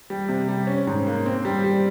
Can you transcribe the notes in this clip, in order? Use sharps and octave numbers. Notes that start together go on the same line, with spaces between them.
G3
C3
G3
C#4
G#2
A#3
C4
G3
G3